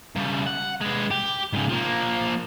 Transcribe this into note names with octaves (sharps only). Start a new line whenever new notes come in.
C#3 G3
F#5
G#3 B4
G4
G#2 C#3
F3 A#3